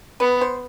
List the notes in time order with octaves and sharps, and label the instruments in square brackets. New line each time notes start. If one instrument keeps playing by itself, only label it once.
[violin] B3 [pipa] B4
[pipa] C5